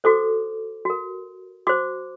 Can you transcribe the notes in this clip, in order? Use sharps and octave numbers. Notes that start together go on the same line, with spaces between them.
F#4 A4 C5 D6
F#4 A#4
F#4 C5 D6